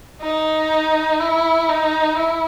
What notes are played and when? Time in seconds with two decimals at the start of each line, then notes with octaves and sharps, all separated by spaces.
0.22 D#4
1.20 E4
1.69 D#4
2.17 E4